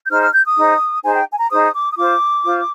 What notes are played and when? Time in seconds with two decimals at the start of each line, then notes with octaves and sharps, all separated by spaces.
0.04 G6
0.09 D#4 G#4 C5 F6
0.21 F6
0.33 G6
0.45 D#6
0.57 D#4 G#4 C5
1.04 D#4 G#4 C5 G#5
1.15 G5
1.32 G#5
1.39 A#5
1.51 D#4 G#4 C5 D#6
1.74 D6
1.91 D#6
1.97 F4 C5 D6
2.44 F4 C5